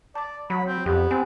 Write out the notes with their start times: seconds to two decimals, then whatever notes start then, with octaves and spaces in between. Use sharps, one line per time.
0.15 D5 A5 D6
0.50 F#3 B5
0.66 C4
0.86 F2 B3 G4
1.11 C4 G#5